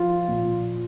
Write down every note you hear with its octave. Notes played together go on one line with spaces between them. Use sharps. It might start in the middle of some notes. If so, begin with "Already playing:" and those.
Already playing: F3 F4
A#2